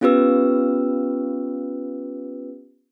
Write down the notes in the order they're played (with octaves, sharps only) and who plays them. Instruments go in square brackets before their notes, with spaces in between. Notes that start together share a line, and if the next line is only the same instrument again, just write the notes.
[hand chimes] B3 C#4 F4 G4 B4 E6